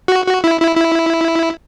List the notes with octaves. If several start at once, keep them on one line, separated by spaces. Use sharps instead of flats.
F#4
F#4
E4
E4
E4